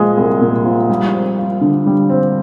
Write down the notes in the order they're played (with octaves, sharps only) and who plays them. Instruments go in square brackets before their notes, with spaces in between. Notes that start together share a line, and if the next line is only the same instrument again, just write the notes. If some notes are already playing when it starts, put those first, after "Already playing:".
Already playing: [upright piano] A#2 F3 G#3
C2
A#2
F3
G3
C4
F4
D3
G3
C4